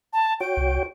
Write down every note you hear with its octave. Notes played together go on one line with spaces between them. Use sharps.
A5
F#4 C#5 G5 D7
C2